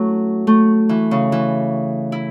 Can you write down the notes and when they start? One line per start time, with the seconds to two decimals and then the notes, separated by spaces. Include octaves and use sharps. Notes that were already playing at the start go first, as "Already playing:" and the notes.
Already playing: F#3 A3 C#4 E4
0.47 A3
0.89 E3
1.11 C#3
1.32 E3
2.12 E4